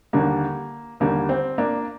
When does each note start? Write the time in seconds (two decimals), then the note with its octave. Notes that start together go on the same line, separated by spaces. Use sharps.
0.13 D#2 D3 G3 A#3
1.00 D#2 D3 G3 A#3
1.29 C4
1.58 A#3 D4